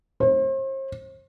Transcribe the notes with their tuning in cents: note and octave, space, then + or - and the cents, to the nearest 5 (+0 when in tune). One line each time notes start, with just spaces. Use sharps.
C5 +40